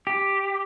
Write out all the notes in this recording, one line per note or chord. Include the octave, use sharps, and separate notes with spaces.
G4